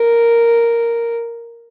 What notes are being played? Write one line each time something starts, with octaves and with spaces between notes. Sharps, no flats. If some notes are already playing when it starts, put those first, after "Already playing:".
Already playing: A#4